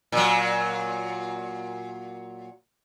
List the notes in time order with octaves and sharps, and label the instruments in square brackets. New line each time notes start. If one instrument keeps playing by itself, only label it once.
[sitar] A#2 F#3